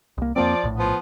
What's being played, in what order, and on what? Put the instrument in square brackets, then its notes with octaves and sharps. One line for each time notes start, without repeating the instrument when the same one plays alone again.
[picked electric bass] C2 A#3
[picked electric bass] F2 A#3 C4 [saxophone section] F3 D5
[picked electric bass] A#1 A2
[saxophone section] F3 B3